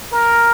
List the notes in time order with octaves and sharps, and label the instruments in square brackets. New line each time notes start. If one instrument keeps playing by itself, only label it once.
[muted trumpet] A#4